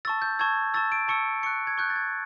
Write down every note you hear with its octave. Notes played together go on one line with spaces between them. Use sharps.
A5 C#6 E6 A6
G6
A5 C#6 E6 G#6
A5 C#6 E6 A6
D7
A5 C#6 E6 C#7
C#6 F#6 C#7
G#6
C#6 F#6 G6
A6
G#6